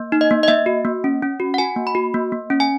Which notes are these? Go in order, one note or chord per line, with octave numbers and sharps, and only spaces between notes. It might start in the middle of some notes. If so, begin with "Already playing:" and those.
Already playing: A#3
D#4
D#5
A#3
D#5
A#3 E5
F#4
A#3
C#4
C#4
F#4
F#5
F#4 G#5
A#3
B5
F#4
A#3
A#3
C#4
G#5